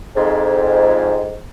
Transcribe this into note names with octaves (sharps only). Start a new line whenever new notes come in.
F2 G#2